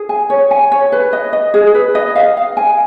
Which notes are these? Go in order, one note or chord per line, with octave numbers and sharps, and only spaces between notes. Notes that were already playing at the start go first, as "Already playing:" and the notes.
Already playing: G#4
G#5
C#5
G#5
C#5
B4
D#5
D#5
G#4
B4
D#5
F5
F5
G#5